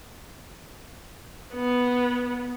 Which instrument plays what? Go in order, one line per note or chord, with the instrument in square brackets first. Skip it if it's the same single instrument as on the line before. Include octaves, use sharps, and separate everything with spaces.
[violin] B3